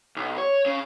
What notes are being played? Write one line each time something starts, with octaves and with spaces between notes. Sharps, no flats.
B1
C#5
C#3